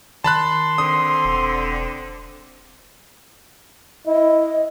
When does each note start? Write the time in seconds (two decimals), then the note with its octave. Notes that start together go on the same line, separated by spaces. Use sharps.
0.24 D#3 A5 B5 C6 F#6
0.78 D3 C4 D#6
1.25 E1
4.06 E4 D#5